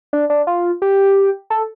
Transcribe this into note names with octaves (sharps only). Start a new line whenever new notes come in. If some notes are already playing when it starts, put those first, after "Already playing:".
D4
D4
F4
G4
A4